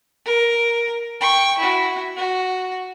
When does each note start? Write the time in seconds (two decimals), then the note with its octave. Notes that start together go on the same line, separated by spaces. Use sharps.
0.25 A#4
1.20 G5 C#6
1.58 E4 F#4
2.16 F#4